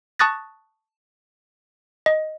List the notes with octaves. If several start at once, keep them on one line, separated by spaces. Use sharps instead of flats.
A5 C#6 D#6 F#6 A6 A#6
D#5